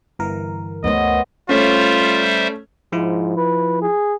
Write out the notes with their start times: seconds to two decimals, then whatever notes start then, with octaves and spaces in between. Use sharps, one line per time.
0.19 G1 E3 A#4
0.84 D2 A3 B3 C5 C#5 D#5
1.49 G3 A3 C#4 F4 C5 E5
2.92 G#2 F3 E4 F4
3.37 B4
3.82 G#4